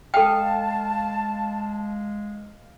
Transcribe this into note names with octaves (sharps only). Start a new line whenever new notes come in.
G#3 A4 F5 G5 A5